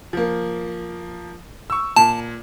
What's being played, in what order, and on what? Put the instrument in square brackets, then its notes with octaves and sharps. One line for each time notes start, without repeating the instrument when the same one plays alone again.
[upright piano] F3 A#3
C#6 E6
[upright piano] A#2 [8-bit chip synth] A5